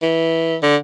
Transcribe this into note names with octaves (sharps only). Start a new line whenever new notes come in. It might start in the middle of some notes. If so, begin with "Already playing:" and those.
E3
D3